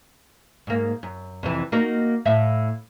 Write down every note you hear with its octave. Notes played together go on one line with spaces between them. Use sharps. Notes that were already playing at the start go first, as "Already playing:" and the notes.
G#2 A#3
F#2
F2 C3 E3
A#3 D#4 F#4
A2 E5 F5